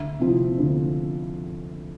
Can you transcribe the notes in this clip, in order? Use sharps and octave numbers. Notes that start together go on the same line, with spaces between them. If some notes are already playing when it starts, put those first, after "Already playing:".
Already playing: D2 E5
C3 F3 C4 E4
D2